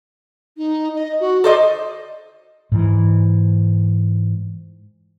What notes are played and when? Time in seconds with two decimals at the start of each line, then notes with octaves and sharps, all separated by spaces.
0.57 D#4
0.95 D#5
1.20 F#4
1.44 A4 C5 D5 D#5
2.72 G#2 E3